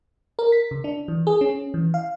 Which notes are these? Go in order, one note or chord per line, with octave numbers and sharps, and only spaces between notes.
A#4
B6
C#3
D4
E3
G#4
C#4
E3
F5